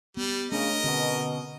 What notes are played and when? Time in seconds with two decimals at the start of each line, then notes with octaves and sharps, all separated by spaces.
0.17 G3 B3
0.52 C#3 A3 D4 A#4 D#5
0.84 B2 D3 C4 C#4